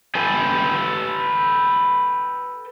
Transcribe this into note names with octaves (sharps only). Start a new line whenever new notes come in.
A4 B4 G5 G#5